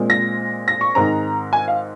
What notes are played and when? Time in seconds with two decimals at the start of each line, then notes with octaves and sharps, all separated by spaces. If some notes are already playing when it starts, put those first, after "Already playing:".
Already playing: A#2 G#3 C4
0.10 A#6
0.68 A#6
0.81 C#6
0.95 G#2 D#3 G#3 C4 A#5
1.53 G#5
1.68 F5